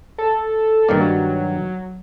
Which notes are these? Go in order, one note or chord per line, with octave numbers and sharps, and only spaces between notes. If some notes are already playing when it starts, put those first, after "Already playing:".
A4
G2 D#3 A#3 D5
F#3